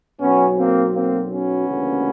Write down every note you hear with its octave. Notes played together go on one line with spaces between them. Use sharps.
B1 B2 F#3 B3 C#4
A#3 C4
A#3 C4
B3 C#4
D2 C#3 E3 G3 A#3